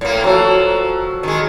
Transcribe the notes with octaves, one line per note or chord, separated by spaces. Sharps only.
A2 A#3
F3 F#3 F#4 A4
D#3 G#3